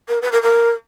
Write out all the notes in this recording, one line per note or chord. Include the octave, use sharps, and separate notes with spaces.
A#4
B4
A#4
A#4